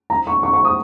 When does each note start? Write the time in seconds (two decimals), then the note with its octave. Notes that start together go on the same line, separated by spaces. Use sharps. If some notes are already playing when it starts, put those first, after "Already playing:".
0.10 A#5
0.27 C#6
0.43 C#6
0.53 C#6
0.65 D#6